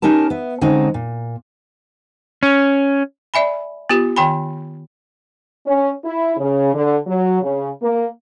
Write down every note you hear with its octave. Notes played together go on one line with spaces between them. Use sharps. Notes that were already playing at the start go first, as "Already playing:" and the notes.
C#4 D#4 G4 A#4 A5
B3 E5
D3 G#3 C4 C#4 D#4
A#2
C#4
D5 E5 G#5 B5
B3 F4 G4
D#3 G5 G#5 B5
C#4
E4
C#3
D3
F#3
C#3
A#3